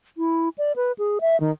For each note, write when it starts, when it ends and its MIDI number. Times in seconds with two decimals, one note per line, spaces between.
0.18 0.49 64
0.58 0.72 74
0.76 0.92 71
0.98 1.18 68
1.21 1.39 76
1.40 1.51 51